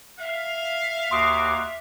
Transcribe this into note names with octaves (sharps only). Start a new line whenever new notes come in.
E5 F5
D#2 F#4 C6 D6 D#6 C7